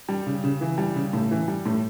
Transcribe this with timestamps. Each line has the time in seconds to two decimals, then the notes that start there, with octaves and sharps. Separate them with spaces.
0.09 G3
0.26 C#3
0.44 C#3
0.61 E3
0.78 G3
0.96 C#3
1.13 A2
1.31 E3
1.48 G3
1.66 A2